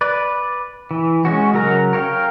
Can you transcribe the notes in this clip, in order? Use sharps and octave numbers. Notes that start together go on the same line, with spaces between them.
B4 D5
E3
G#3 C#4 F#4
C#3 F#3 A#4 A#5
A#4 C#5 F5 G5